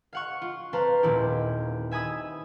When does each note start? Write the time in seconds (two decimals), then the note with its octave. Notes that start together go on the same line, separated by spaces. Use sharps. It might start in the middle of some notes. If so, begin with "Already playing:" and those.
0.13 F5 F#5 C#6
0.42 F4
0.73 C4 B4 C5 F5 A5 A#5
1.03 D#1 E4 G4
1.91 E5 G#5 B5 D#6 E6